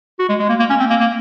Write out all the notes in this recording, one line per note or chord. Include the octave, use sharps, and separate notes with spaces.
F#4
G#3
G#3
A#3
A#3
C#4
C4
A#3
A#3